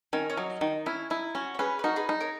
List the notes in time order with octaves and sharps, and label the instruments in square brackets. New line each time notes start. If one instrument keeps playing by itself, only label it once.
[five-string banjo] D#3 [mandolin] C#4
[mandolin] C#4
[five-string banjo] F#3 [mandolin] D#4
[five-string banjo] D#3
[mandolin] C#4 [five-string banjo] E4
[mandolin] D#4 [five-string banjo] E4
[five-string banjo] C#4 [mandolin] F#4
[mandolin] C#5
[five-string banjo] C#4 [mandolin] G#4 B4
[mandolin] B4
[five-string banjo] D#4 [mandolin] F#4 A#4
[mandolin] G#4 B4
[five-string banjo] D#4
[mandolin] A#4 C#5